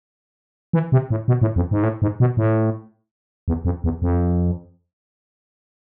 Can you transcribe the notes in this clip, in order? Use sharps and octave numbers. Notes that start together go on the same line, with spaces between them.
E3
C3
A2
B2
A2
F2
G#2
A2
G#2
B2
A2
E2
F2
E2
F2